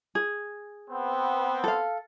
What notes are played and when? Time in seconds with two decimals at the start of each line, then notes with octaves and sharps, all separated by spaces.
0.15 G#4
0.91 B3 C4
1.64 A4 F5